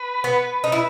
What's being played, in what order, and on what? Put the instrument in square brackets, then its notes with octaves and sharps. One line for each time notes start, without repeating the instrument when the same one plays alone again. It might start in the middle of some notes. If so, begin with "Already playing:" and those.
Already playing: [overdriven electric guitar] B4
[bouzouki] B3
D#4
E4